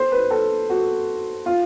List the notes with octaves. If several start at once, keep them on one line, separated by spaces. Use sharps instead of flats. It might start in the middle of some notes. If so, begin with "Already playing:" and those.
Already playing: C5
B4
A4
F#4
F4